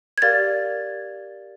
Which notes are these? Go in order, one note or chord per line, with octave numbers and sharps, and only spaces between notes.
G#6
G4 A#4 D5 F5 A6